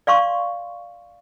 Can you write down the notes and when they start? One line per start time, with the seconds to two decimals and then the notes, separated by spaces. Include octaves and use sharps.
0.07 D5 F5 C6 C#6